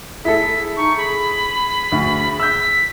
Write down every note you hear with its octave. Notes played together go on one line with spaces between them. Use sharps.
E4 G#4 A4 B6
D#4 C#6
G#4 B5
D2
E6 G6 B6